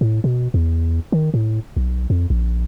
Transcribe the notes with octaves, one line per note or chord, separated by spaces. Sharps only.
A2
B2
E2
D#3
A2
B1
F2
A#1